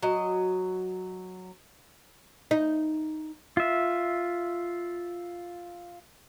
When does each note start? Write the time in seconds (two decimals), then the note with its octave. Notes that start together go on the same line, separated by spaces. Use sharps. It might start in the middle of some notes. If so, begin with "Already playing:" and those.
0.03 F#3 D#5
2.51 D#4
3.57 F4 E5